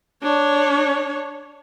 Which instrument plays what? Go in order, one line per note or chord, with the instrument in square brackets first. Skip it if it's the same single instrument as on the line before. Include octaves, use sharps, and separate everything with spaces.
[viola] D4 C#5